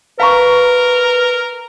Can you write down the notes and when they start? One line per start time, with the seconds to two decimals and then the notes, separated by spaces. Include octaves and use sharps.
0.20 A#4 B4 F5 A#5 C#6